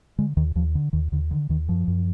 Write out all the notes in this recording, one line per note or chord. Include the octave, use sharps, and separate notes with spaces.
D3 G#3
D#2 D#3
D#2 F3
D3
D#2 D#3
D#2 D3
D3 D#3
D#2 D#3
F#2 F3
F#2